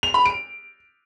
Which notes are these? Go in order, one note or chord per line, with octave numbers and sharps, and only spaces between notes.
F7
B5
D7